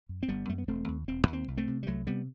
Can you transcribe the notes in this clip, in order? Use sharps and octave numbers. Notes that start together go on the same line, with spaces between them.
F#2
C4
G1 G3 B3
F#2 A3
B3
E1 A3 C4
D#2
E1 C4
D#2
C4
C2
A3 C4
C3
G3
C2 F#3 A3
C3 G3 B3